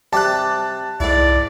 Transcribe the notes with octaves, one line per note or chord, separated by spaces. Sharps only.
C3 G3 D5 A5 F#6
C2 G#2 E4 D5